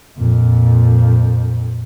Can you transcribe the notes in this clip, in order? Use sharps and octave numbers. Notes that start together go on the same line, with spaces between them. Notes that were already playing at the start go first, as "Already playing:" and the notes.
F2 A#2